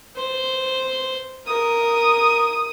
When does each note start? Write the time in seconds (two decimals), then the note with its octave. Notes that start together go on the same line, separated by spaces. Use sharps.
0.16 C5
1.47 A#4 D#6